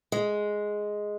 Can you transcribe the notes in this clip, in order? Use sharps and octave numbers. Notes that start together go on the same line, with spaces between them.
G#3